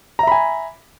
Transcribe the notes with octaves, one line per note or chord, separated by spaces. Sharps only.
E5 G#5 A#5 B5